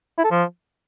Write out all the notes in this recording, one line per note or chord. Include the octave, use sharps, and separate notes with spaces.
E4
A4
F3